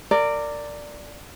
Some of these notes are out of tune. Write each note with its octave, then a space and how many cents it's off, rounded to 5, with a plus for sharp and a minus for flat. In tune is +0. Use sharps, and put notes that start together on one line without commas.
A#4 -25 D5 +0